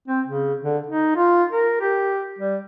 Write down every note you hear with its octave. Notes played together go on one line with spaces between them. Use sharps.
C4
C#3
D3
D#4
F4
A#4
G4
G3